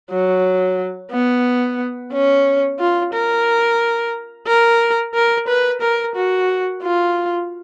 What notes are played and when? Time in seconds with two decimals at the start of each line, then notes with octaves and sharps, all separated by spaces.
0.11 F#3
1.11 B3
2.12 C#4
2.79 F4
3.13 A#4
4.46 A#4
5.14 A#4
5.47 B4
5.81 A#4
6.15 F#4
6.82 F4